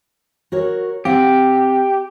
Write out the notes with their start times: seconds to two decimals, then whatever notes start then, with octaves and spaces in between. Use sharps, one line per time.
0.52 F#4 A#4 C#5
1.05 C4 G4 F5 F#5